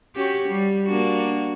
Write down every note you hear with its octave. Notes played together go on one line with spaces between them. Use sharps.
C#4 F#4 G4
G3
A#3 D4 F#4